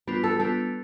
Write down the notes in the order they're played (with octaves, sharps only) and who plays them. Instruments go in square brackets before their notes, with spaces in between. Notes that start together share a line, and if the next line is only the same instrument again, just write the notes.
[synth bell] G3 B3 D4 F4 [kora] B4
[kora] A4
[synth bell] G3 B3 D4 F4 [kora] A4